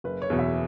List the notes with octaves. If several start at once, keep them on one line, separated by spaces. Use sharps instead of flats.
F#1 B4
C#5
E2 B2
E5